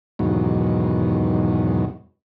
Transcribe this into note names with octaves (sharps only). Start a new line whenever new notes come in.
E2 G#2 B2 D#3 F#3